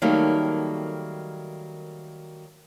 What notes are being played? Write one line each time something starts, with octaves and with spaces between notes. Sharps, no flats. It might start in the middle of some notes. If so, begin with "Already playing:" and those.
D#3 F#3 G3 A3 A#3 A4